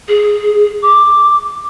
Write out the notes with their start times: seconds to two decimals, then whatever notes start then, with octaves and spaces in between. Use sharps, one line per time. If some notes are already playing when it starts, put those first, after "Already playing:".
0.08 G#4
0.82 D6